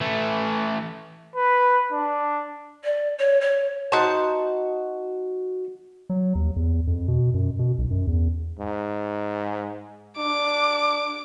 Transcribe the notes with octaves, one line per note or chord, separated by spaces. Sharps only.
E3 A3
B4
D4
D5
C#5
C#5
D#4 F#4 C5 A5
F#3
D#2
E2
F2
B2
F#2
B2
B1
F#2
E2
G#2
D4 D6